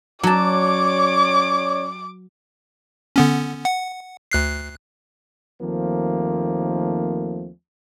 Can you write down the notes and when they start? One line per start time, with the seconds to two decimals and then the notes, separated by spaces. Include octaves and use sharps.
0.23 F#3 C#4 C#5 D5 A5 D6
3.16 D3 B3 C#4
3.65 F#5
4.31 D2 F#6 C7
5.61 D#2 D#3 F3 A3 A#3 C4